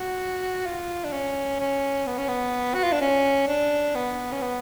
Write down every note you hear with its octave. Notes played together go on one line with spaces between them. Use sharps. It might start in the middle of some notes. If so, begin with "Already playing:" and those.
Already playing: F#4
F4
D4
C#4
C#4
B3
C#4
B3
F#4
F4
D4
C#4
D4
B3
C#4
B3